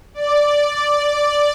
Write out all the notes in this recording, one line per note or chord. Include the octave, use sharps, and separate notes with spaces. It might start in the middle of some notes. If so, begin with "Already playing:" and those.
D5